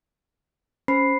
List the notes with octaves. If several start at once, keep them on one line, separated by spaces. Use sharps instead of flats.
C#4 C5 B5 C7